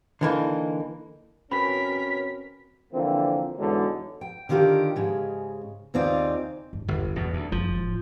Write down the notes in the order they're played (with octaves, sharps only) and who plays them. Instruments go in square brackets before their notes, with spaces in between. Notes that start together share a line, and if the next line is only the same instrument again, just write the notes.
[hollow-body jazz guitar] D3 E3 A#3 D#4
[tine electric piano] C4 F#4 B4 [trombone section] C#4 [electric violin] A#4 B6 [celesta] B5
[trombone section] D3 E3 F3 A#3 C4
E2 G#2 B2 D3 F#3 G#3
[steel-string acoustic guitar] G5
D3 D#3 F4 G4 A#4
G#2 C#3 G#3
D#2 C#3 C4 D#4 F4 D5
[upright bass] G2
[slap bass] G1 [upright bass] E2 F4
[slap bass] E2 B2 [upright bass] C4
[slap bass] D2
[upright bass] F#1 [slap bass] F3
[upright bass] A1 F#2